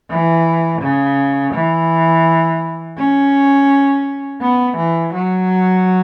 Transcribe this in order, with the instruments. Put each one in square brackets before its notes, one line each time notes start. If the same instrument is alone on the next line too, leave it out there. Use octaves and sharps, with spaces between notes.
[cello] E3
C#3
E3
C#4
B3
E3
F#3